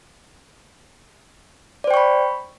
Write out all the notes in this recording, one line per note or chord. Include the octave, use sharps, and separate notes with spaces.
C5 D5 G5 B5 C#6